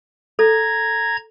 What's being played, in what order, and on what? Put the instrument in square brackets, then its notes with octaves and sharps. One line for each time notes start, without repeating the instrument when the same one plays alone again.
[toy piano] A4 [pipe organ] A#5 G#6